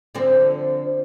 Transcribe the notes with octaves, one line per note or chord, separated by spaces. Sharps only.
D3 F3 C4